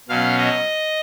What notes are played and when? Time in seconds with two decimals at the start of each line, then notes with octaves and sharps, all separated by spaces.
0.09 B2 F#3 C#4 F5
0.38 D#5